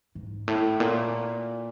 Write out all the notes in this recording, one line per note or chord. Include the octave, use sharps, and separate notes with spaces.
G#2
A2
A#2